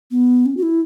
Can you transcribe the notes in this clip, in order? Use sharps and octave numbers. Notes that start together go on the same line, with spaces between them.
B3
C#4
F#4
E4